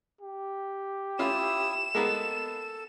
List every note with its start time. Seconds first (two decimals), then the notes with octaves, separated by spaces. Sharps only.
0.21 G4
1.19 C#4 E4 F4 E5 D#6 E7
1.95 G#3 A#3 B3 A4